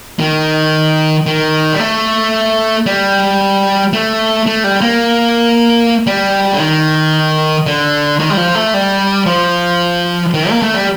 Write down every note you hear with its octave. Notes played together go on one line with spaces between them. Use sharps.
D#3
D#3
G3
A3
G3
A3
A3
G3
A#3
G3
D3
D#3
D3
D#3
G3
F3
A3
G3
F3
D#3
A#3
A3
G3